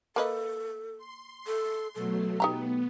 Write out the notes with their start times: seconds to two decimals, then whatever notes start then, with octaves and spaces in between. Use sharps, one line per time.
0.16 A#3 A4 B4 D#5
0.98 C6
1.47 A4
1.95 B2 F#3 A3 A4
2.40 B3 D#4 G4 A#5